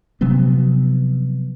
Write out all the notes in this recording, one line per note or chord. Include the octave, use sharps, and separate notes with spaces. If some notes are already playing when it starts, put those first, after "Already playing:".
C3 F3 F#3 B3